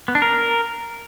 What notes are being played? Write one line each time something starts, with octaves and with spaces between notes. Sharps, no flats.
B3
D4
A#4